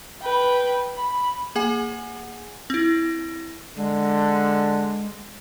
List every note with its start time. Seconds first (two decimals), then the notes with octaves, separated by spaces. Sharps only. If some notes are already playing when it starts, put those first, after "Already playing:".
0.22 B4 G5
0.96 B5
1.55 A#3 G#4 F#5 G#5
2.70 C4 E4
3.76 D3 G#3